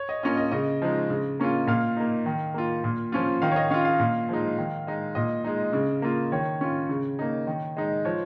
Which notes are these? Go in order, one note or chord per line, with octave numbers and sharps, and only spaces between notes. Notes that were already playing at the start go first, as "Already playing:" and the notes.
Already playing: C#5
D#5
A#3 C#4 F4 D#5
D#5
C#3 D#5
F3 G#3 D#4
C#3
A#3 C#4 F4
A#2 F5
A#3 D#4
D#3
A#3 F4
A#2
F3 C#4 F4
D#3 F5
C#5
D#5
C#4 F4 F5
F5
A#2
F3 G#3 D#4
D#3
G#3 D#4
A#2 D#5
G#3 D#4
C#3
A#3 F4
D#3 C#5
C#4 F4
C#3
A#3 D#4
D#3
G#3 D#4
F3 C#5